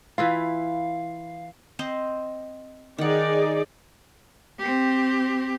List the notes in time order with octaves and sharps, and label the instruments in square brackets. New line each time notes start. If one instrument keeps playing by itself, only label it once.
[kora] E3 E4 F4 [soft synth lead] F5
[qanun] C4 C5 D#5
[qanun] D#3 F#5 [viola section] D#4 G#4 D5
[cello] C4 G4